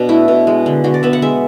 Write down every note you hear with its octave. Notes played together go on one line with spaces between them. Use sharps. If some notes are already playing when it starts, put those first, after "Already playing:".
Already playing: B2 D4
A3 E4
B2
G#3
D3
D3 F#4
D5
B3 E5
F#5
G#3 E5